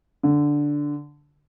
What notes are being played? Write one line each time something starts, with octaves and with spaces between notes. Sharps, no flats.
D3